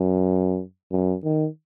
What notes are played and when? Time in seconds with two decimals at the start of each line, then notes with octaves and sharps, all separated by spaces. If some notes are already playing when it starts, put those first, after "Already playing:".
Already playing: F#2
0.92 F#2
1.24 D#3